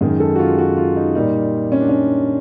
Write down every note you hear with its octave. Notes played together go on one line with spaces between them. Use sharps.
F#2 D#3 G#3 G#4
A4
F#4
F4
F#4
F4
D#4
A#2 G3 A#3 D#4
C#4
D4
C#4